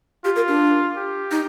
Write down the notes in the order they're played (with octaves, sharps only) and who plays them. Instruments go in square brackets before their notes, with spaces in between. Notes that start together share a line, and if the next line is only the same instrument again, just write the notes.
[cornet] F4 [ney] G4
[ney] A#4
D4
[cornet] G4
[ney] D#4